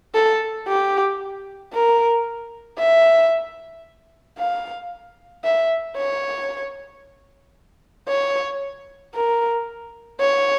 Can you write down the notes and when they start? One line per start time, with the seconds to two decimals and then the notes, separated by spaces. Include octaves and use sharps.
0.15 A4
0.68 G4
1.73 A#4
2.79 E5
4.39 F5
5.44 E5
5.97 C#5
8.09 C#5
9.14 A#4
10.20 C#5